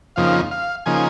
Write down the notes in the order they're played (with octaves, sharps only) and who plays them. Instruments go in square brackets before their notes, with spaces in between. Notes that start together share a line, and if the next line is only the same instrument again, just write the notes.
[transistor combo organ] F2 C#3 F3 A#3 D#4 F5
F5
C#3 F3 A#3 D#4 G#5